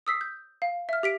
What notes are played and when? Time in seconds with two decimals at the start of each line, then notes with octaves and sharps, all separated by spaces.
0.07 D#6 E6 B6 C7
0.21 G6
0.62 F5
0.89 E5 F6
1.03 G4 B6 D7